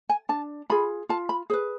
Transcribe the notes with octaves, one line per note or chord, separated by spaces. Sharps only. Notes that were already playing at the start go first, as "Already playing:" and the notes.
G#5
D4 A5
F4 G#4 B5
F4 A5
B5
G#4 B4 C5